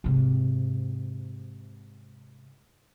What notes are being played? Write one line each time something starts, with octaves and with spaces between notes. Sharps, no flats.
G#2 C3